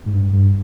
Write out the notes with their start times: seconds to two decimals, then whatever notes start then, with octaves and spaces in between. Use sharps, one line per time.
0.06 G#2
0.13 G2
0.33 G2